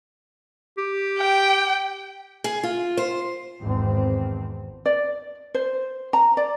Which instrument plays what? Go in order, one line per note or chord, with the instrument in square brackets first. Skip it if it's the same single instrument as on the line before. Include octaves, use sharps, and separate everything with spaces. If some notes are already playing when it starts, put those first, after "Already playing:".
[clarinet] G4
[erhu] G5
[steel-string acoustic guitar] G#4
F4
C5
[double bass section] G#1 E2 C4
[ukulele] D5
C5
A#5
D5